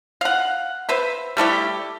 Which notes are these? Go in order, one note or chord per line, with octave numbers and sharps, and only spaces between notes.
F5 F#5
B4 C5 E5
G3 A3 E4 G4